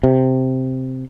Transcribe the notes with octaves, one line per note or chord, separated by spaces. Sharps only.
C3